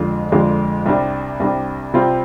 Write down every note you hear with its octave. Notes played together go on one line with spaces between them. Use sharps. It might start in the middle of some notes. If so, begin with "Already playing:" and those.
Already playing: F2 D3 G#3 D4 F4
F2 D3 G#3 D4 F4
C2 C3 G3 D4
C2 C3 G3 D4
C3 G3 C4 F4